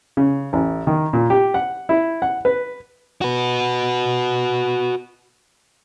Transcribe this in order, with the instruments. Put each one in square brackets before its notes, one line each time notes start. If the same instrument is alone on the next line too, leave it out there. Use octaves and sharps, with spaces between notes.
[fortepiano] C#3
A1
D#3
A#2
G4
F#5
E4
F#5
B4
[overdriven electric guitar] F#4 B4